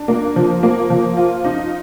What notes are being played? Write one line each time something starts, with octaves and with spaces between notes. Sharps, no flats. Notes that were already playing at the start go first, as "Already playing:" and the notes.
Already playing: D4
A#3
F3
A#3
F3
F4
D#4